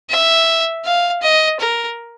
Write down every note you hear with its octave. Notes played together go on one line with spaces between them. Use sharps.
E5
F5
D#5
A#4